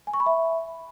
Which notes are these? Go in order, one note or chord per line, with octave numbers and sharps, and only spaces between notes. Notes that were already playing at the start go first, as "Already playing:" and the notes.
G#5
C#6
B5
E5